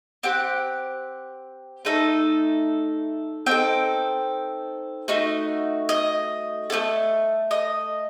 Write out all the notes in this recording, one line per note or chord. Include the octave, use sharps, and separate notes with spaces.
C4 G4 F#5
A3 D#4 A4
C4 D#4 A4 G5
A3 D#4 F#4
D#5
A3 D#4 A4
D#5